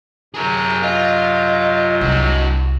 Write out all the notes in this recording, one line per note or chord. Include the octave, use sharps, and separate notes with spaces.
F#2 C3 F#3 G#4 A#4
F4 D#5
C2 G2 F#4